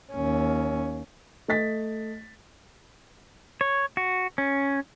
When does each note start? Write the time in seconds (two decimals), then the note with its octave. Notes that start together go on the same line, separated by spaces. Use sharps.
0.13 D#2 C#4
1.48 A3 D#5 A6 B6
3.61 C#5
3.97 F#4
4.38 C#4